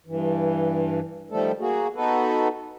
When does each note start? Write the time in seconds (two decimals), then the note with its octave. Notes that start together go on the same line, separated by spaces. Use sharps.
0.07 G2 E3
1.30 D#3 F3 G3 A3 A4
1.60 A#3 F#4 G#4
1.95 B3 D#4 F#4 A4 B4